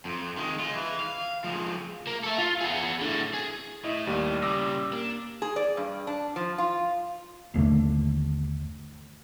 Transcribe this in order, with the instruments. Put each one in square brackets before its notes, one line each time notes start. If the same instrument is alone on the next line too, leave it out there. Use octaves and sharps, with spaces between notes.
[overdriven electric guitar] F2
D#3 G#3
G#3 F4
E3
F5
F3 G#3
A#3
A4 E5
F4
B3 G#4
A2 D3
G#4
[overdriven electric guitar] A2 [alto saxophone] E4 [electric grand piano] D#5
[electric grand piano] D#2 D#7 [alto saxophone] G3
[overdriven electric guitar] A#2 C#3 [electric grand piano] D6 E6 A#6
[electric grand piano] A#3 [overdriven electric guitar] D4
[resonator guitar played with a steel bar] G#4
D5
G2
D4
F3
F4
[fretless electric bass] G1 D#2 D3 A3